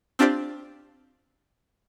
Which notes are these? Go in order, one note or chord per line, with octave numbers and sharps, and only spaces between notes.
C4 D4 F4 G4 C5 D5